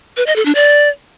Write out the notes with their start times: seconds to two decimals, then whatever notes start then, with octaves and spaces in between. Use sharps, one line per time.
0.17 B4
0.26 D#5
0.36 A4
0.45 D4
0.55 D5